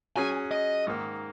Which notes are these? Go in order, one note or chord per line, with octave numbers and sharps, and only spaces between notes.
F#3 C#4 G#4 G#5
D#5
G#2 D#3 A#3